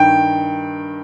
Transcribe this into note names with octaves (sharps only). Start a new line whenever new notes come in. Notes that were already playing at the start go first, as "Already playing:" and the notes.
Already playing: G2 D#3 G5